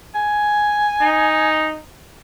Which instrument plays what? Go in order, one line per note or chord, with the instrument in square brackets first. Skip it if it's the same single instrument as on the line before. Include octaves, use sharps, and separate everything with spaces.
[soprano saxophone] G#5
[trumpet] D#4